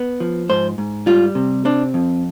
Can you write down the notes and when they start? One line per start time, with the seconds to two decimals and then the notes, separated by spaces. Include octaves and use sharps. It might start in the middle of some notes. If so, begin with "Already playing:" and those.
Already playing: B3
0.20 F3
0.49 G#2 C5
0.78 G#2
1.06 G3 F4
1.35 C3
1.65 C4 D4
1.94 F2